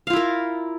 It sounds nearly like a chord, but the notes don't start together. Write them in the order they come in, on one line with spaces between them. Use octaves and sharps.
F5 F4 E4 A#4